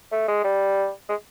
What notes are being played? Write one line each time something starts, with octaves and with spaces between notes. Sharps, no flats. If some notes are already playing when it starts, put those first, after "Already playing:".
A3
G#3
G3
G#3